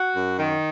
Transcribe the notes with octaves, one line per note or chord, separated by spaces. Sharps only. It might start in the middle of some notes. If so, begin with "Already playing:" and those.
Already playing: F#4
F#2
D#3